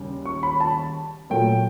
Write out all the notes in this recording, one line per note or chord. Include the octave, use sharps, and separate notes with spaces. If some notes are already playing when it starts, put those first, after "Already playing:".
Already playing: D#2 C#3 G3
C#6
B5
A5
A#2 F#3 A3 G5